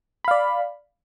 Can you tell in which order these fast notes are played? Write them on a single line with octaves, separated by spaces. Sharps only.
B5 F5 D5